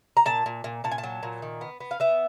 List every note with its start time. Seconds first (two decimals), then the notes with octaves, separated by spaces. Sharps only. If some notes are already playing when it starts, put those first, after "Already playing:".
0.17 A#5
0.26 A#2 A5
0.46 A#2
0.64 A#2
0.84 A#2 A5
0.91 G#5
0.98 A5
1.03 F#3
1.23 A#2
1.42 D#3
1.61 B3
1.80 B3
1.91 F5
2.00 B3 E5